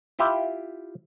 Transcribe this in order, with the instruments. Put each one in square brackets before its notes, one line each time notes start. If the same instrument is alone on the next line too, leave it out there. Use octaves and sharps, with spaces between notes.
[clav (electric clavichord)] E4 F4 G4 E5 G5